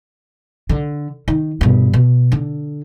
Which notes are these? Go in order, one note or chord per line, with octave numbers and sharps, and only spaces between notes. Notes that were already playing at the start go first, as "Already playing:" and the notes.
D3
D#3
G2 B2
B2
D3